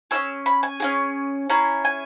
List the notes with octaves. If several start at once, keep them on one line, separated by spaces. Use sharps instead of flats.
C#4 E4 G#4 E6
B5
G#5
C#4 E4 G#4
C#4 E4 G#4 A#5
G#5